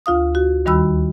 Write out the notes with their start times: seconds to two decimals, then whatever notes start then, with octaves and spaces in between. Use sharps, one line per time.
0.06 D2 F4 F5 D#6
0.35 F#4
0.66 D#2 D#3 G3 F#4 B5 E6